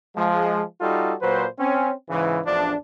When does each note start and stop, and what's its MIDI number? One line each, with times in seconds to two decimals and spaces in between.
0.16 0.62 53
0.16 0.62 56
0.81 1.14 55
0.81 1.14 63
0.81 1.14 65
0.81 1.14 66
0.81 1.14 69
1.22 1.46 46
1.22 1.46 54
1.22 1.46 71
1.22 1.46 72
1.59 1.91 60
1.59 1.91 61
2.10 2.40 44
2.10 2.40 49
2.10 2.40 52
2.46 2.75 33
2.46 2.75 40
2.46 2.75 53
2.46 2.75 62